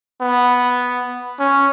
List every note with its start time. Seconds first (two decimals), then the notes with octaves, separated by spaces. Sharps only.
0.21 B3
1.39 C#4